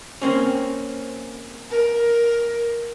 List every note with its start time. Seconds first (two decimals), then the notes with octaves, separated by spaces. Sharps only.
0.22 A#3 C4 C#4
1.71 A#4